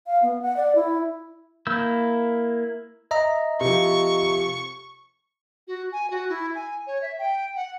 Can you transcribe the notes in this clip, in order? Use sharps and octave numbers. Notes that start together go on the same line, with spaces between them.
F5
B3
F#5
D5
E4
A#3 E4 E6 G6
D#5 E5 A#5
C3 F3 C#6
F#4
G#5
F#4
E4
G#5
C#5
E5
G5
F#5